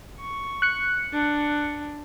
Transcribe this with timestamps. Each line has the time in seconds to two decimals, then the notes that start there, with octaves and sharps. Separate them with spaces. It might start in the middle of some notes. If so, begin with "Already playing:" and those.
0.21 C#6
0.62 F#6 C#7
1.13 D4